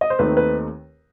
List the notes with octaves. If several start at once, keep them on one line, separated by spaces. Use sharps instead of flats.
D#5
C5
D#2 D#3 A3 C4 D#4 B4
B4